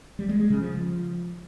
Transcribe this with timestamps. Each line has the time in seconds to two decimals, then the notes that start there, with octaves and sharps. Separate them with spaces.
0.19 G3
0.29 G#3
0.40 G#3
0.50 C#3
0.61 F3